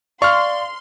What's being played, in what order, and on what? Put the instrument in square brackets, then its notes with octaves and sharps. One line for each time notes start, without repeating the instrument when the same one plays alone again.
[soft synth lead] D5 [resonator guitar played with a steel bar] F5 [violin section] C6 [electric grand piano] C#6 F6